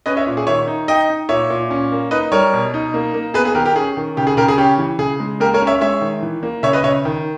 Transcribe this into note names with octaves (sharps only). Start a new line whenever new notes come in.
C#4 B4 D#5
C#5 E5
A#2
G#4
D#3 C#5 E5
D#4
D#4 D#5 G5
D#4
A#2 C#5 E5
A#2
C#4
A#3
D#4 B4 D#5
G3 A#4 C#5
B2
D#4
A#3
A#3
B3 G#4 B4
G#4
D#3 G4 A#4
G4 A#4
C#4 G#4
D#3
C#3 G4
G#4
C#3 G4 A#4
G#4
C#4 G4
E3
C#3 G#4
G#3
A#3 G4 A#4
A#4 C#5
C#4
C#5 E5
G#3 C#5 E5
D#3
E3
A#3
C#3 C#5 E5
B4 D#5
C#3 C#5 E5
D#3